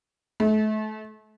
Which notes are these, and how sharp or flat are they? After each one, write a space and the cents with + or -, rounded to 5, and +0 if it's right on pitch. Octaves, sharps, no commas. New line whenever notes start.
A3 -35